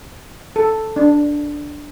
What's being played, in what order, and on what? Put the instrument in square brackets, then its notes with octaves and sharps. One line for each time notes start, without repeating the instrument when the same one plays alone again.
[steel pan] A4
D4